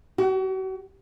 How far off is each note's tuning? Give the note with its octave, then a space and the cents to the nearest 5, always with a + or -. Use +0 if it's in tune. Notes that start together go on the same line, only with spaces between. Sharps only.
F#4 +40